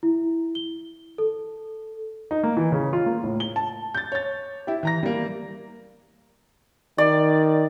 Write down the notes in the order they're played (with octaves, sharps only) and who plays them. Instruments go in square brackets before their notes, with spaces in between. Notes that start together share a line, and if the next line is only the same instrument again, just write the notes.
[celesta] E4
G7
A4
[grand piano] D#4
A#3
E3
C#3
F4
A#3
A2
G7
A5
G6 A6
C#5 A6
E4 G4
E3 A#5 A#6
G3 A#3
[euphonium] D#3 [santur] D5